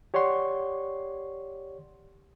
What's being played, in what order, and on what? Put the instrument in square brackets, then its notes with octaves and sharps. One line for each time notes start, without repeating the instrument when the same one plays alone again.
[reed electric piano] G4 C#5 D5 F#5 C6 C#6